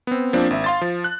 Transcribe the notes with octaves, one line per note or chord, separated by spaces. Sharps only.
B3 C4
F3 A#3 C4 D4
G#1 E5
F5 C6 A6
F3
F#6